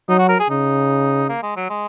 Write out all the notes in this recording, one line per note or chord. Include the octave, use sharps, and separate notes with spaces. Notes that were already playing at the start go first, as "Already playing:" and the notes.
F#3 D#4
F#4
A#4
G#4
C#3 D#4
A#3
G#3
F#3
G#3